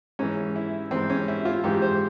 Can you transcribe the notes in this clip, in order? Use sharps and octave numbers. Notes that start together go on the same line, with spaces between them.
G#2 E3 C#4
E4
G#2 E3 C4
C#4
E4
F4
G#2 E3 G4
C5